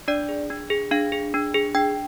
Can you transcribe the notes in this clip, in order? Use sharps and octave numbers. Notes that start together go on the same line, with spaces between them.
D4 D5
G#4
D4
G#4
D4 F5
G#4
D4
G#4
D4 G5